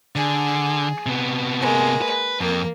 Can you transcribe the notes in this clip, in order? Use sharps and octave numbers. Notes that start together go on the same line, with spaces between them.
D3 G#4
C3 B3
G#3 A#3
B4
F2 A#3